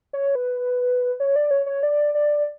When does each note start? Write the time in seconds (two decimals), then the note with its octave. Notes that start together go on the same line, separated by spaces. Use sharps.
0.13 C#5
0.35 B4
1.20 C#5
1.36 D5
1.51 C#5
1.66 C#5
1.83 D5
2.14 D5